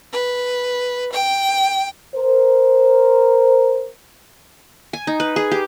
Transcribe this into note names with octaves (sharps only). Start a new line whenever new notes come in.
B4
G5
A#4 C5
G#5
D#4
B4
G#4
G4